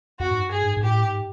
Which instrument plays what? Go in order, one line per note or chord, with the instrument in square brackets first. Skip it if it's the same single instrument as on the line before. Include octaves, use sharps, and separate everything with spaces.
[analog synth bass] F2 [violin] F#4
[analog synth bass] G#2
G2
[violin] G#4
[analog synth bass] G#2
G#2
[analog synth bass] A2 [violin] G4
[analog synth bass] G#2